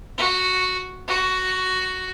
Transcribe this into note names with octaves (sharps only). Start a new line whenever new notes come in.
F#4
F#4